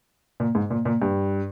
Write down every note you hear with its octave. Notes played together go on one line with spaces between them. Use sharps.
A#2
G#2
A#2
A#2
G2